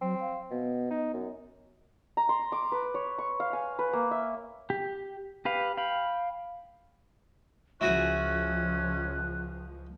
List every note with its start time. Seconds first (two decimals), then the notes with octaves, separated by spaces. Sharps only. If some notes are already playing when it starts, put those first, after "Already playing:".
0.02 F#3 C4
0.21 F5
0.51 B2 B3
0.91 D#4
1.14 F#2
2.17 A#5
2.29 C6
2.52 D6
2.72 B4
2.94 C#5
3.19 C#6
3.40 F5
3.53 G#5
3.79 B4
3.93 A#3
4.11 E5
4.70 G4
5.45 G4 B4 F5
5.77 F5 G5 B5
7.81 C#2 F3 C#4 E4 F#4 G#4 F#6